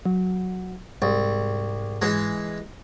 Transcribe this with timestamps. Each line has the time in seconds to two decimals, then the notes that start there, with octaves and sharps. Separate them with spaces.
0.06 F#3
1.02 C2 G#2
2.02 E3 G#3